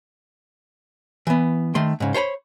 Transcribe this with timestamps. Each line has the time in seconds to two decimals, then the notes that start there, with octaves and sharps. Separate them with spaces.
1.27 E3 B3
1.75 D#3 A3 C6
2.00 G#2 C#3
2.14 C5 C#5 A5 B5